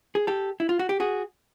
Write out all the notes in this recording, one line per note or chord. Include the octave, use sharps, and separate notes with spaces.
G#4
G4 A4
E4
F4
F#4
G4
F#4 G#4